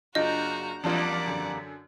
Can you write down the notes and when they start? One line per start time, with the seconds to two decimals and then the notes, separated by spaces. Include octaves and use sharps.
0.15 F#1 D4 F4 F#4 D#5 A#5 G6
0.84 E2 G3 A#3 D4 F4 D5 F#5
1.27 F#2 D3